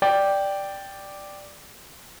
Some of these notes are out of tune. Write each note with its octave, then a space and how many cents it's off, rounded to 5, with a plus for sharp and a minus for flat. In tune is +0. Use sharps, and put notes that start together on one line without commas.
D5 +0 G5 +0